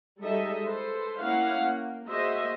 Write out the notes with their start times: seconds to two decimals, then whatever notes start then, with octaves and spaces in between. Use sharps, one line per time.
0.20 G3 G#3 D#4 A4 D#5 E5
0.65 A4 B4 C5
1.21 A#3 C#4 E4 F5 F#5
1.59 A#3
2.07 A#3 F#4 G#4 C5 D#5 E5